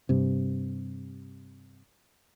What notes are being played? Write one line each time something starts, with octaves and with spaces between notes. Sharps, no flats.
G2 C3